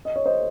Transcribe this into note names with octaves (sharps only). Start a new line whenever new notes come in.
D#5
C#5
C5 D#5